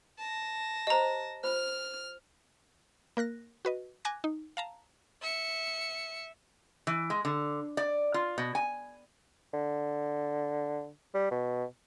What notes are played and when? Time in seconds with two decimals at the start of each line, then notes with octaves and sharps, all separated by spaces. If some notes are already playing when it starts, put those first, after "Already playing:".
0.19 A5 A#6
0.87 G4 C5 D#5 A#5
1.43 F4 C5 F6
3.17 A#3 A#4 F#6 A#6
3.65 F#4 B4 D#5
4.05 G#5 D6 F#6 G#6 A#6
4.24 D#4
4.57 F5 A5 A#5
5.21 E5 C#7
6.87 E3
7.10 G#3
7.25 D3
7.77 D5
8.14 F4
8.38 B2
8.55 G#5
9.53 D3
11.14 G3
11.31 B2